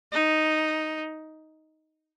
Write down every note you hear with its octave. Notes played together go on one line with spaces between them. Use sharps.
D#4